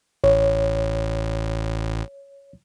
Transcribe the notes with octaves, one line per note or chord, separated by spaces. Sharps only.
A1 C#5